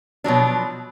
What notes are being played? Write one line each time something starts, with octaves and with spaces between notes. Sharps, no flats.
B2 F3 F#3 D4